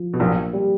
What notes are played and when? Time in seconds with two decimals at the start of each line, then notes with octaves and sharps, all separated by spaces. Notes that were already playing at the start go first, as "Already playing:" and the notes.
Already playing: F3
0.13 B2
0.20 A#1 A#2 A#3
0.53 G3